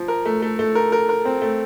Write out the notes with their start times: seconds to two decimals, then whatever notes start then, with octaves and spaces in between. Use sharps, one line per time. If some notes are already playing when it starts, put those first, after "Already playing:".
Already playing: F3
0.08 A#4
0.25 A3
0.42 A3
0.59 A3
0.75 A#4
0.92 A#4
1.09 A#4
1.25 C4
1.42 A3